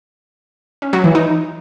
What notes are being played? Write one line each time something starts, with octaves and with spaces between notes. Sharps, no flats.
C#4
F#3
E3
D#4